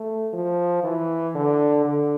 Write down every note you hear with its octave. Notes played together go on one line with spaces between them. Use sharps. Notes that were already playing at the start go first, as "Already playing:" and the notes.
Already playing: A3
F3
E3
D3
D3